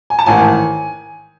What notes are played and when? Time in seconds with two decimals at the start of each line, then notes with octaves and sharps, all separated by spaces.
0.10 G#5
0.19 A5
0.26 A1 G#2 D#3 G#5